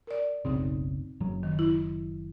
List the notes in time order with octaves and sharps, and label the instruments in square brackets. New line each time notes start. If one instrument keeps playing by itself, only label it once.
[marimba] A#4 D5
[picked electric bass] F#1 B1 C#3 [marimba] C4 D#4
[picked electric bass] F#1 F#3
[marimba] D#3
E4